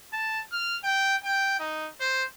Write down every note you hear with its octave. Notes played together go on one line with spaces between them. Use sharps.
A5
F6
G5
G5
D#4
C5